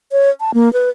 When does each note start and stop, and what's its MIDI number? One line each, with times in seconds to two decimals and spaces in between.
0.12 0.30 73
0.40 0.51 81
0.54 0.72 58
0.73 0.90 71